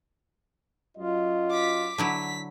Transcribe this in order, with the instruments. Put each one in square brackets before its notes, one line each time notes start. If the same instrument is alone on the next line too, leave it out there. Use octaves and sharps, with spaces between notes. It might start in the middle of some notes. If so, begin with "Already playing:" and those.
[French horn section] F#2 F#3 D#5 [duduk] F4
[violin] D6 B6
[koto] D3 F#3 E4 [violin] B6